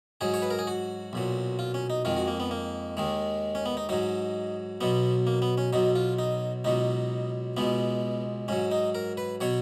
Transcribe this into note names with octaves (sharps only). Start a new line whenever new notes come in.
G#2 F#3 G#4
C#5
B4
A#4
G#4
F#4
B1 A#2 F#3
F4
C#4
D#4
F2 D#3 G#3 F4
F#4
A#3
B3
A#3
D#2 D#3 G#3
C#4
B3
D#4
G#2 F#3 D#4
B1 B2 F#3 B3
A#3
B3
C#4
B1 B2 F#3 D#4
F4
D#4
C#2 B2 F#3 D#4
C#2 B2 G#3 B3
G#2 F#3 C#4
D#4
A#4
B4
B2 F#3 C#5